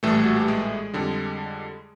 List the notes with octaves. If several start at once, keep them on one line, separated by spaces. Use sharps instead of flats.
A#1 A2 E3 G3 A3 A4
F#4
G4
G#3 G#4
F2 D3 G3